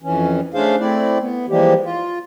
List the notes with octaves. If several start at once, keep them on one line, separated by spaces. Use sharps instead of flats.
F2 E3 C#4
A3 C#4 D4 G#4 C5 F5
A3 C4 E4 D5
B3
E3 F3 G3 G#3 A#3 G4
F4